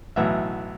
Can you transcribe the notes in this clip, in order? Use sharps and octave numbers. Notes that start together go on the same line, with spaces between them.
B1 A2 E3 E5 F#5